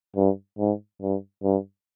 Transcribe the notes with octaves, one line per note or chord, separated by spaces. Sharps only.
G2
G#2
G2
G2